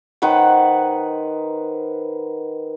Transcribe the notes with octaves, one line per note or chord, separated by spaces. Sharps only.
D#3 B4 C5 F#5